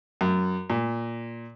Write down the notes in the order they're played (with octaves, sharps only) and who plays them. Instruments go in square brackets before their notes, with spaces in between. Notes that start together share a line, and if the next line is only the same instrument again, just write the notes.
[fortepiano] F#2
A#2